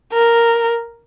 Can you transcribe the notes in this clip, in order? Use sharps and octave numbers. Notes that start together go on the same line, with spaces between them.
A#4